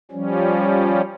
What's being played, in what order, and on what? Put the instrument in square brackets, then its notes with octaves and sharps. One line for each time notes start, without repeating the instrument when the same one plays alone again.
[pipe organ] F3 G3 C#4